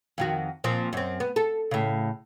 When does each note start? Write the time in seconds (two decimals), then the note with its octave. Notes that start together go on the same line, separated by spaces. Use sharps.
0.18 F2 D#3 F#4
0.64 A#2 F3 C4
0.93 F#2 C4
1.20 B3
1.36 A4
1.71 A2 C#3